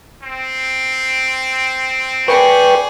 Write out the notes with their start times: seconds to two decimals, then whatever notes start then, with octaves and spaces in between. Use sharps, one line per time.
0.23 C4
2.28 G#4 B4 D5 G5 C#6